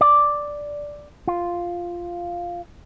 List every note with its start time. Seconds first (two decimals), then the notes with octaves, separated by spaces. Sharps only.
0.01 D5
1.27 F4